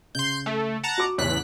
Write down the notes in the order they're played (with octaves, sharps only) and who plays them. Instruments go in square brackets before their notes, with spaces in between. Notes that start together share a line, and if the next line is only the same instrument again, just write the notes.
[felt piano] C#3 [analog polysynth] C6 G6
[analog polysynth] A3
F#5 A5 A#5
[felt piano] F#4 D6
[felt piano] A1 C#3 C#5 [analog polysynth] E2 F#6 B6